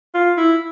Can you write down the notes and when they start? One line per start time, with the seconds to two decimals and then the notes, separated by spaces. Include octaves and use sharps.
0.14 F4
0.37 E4